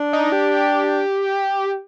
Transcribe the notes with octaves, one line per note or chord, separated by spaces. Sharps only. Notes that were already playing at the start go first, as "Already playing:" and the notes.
Already playing: D4
D#4
G4